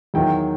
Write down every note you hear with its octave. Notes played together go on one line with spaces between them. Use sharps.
E2 D#3 F#3 G5